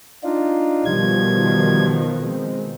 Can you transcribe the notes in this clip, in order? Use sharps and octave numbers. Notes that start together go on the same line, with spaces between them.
D4 D#4 F4
B2 D#3 F3 G3 G#6
G#3 C4